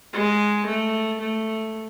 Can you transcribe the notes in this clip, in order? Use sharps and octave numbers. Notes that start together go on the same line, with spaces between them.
G#3
A3
A3